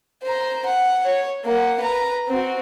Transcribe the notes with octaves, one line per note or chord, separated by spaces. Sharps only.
C5 A#5
F#5
C#5
A#3 F#5
B4 A#5
C4 F#4